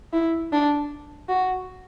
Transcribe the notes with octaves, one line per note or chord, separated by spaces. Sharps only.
E4
D4
F#4